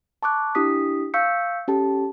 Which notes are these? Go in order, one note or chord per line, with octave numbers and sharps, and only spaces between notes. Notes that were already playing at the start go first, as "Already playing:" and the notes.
A5 C#6 D6 F#6
D4 E4 G4 D#6 B6
F5 C#6 E6 G6 B6 C#7
C#4 G4 A4 A5